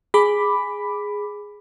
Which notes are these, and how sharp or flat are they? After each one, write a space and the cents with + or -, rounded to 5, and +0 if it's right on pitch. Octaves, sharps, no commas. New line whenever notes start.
G#4 -5 B5 +5 D6 +0